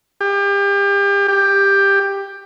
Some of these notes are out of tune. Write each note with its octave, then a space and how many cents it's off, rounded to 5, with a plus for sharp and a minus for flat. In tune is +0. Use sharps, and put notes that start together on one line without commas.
G4 +35
G4 +15